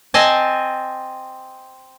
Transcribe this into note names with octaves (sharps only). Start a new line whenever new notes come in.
C4 D#5 G#5 A5